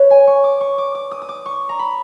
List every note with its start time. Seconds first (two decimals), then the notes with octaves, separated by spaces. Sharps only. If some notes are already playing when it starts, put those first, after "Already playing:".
Already playing: B4 C#5
0.10 G#5
0.27 C#6
0.44 D6
0.61 C#6
0.78 D6
0.95 D6
1.11 D#6
1.22 D#6
1.29 D6
1.46 C#6
1.69 A#5
1.79 B5